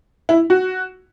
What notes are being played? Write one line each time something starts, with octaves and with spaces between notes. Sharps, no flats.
E4
F#4